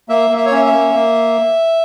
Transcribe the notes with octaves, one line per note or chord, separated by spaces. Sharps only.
A#3 E5
A#3
E5
C#5
C#4 E5
E5
A#3
A#3